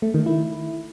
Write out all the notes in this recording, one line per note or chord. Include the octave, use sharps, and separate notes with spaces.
A3
D#3
E4